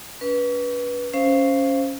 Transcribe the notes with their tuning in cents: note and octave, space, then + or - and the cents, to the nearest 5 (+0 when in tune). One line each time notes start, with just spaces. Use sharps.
C#4 +40 B4 -20
C#4 +0 C5 +0 F5 -20